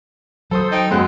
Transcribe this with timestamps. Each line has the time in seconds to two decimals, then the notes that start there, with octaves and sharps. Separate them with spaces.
0.51 F#3 A4 C5 C6 D#6
0.72 D#4 G5
0.91 F#2 G#3 C5 F#6